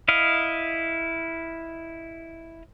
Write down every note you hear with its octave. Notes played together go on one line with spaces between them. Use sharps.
E4 D#5 F5